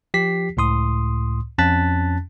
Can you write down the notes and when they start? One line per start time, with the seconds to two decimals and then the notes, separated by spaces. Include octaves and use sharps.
0.14 F3 G4 B6 C7
0.57 C#2 A2 C6 D#6
1.58 F2 C#4 A5 F#6 A6 B6